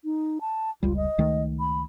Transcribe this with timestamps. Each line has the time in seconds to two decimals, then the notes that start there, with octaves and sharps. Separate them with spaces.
0.04 D#4
0.41 A5
0.83 F1 C#2 G3 F4
0.96 D#5
1.18 C#2 D#3 A3
1.60 B5